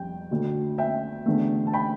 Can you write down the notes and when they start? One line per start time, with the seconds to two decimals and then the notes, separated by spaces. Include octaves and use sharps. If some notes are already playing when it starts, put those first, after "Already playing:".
Already playing: F2 G3 G5
0.31 D2 D3 A3
0.78 E5 G5
1.26 E2 D3 A3
1.67 A5
1.73 G5 B5